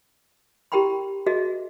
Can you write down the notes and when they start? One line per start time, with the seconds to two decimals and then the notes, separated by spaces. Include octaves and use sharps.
0.72 E4 G4 A#4 G5 B5 C6
1.26 F#4 G#4 A#4 D#5 E5